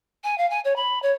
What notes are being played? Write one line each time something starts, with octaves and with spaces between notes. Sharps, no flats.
G#5
F5
G#5
C#5
B5
C#5